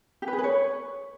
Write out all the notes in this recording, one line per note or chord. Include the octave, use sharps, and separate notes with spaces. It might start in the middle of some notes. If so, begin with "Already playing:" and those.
G4
B4
G#4
B4
C#5